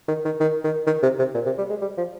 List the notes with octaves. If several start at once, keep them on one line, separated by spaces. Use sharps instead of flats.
D#3
D#3
D#3
D#3
D#3
C3
C3
A#2
C3
G3
G#3
G3
F3